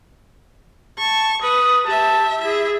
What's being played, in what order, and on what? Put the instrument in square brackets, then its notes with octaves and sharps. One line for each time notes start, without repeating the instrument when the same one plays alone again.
[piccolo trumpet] A5 [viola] C#6
[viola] B4 [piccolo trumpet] D#6
[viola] G4 E5 [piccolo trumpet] A5
[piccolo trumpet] E4 [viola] G#4 E5